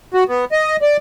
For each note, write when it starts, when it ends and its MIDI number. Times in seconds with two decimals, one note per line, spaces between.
0.14 0.24 66
0.29 0.45 59
0.52 0.77 75
0.82 0.97 74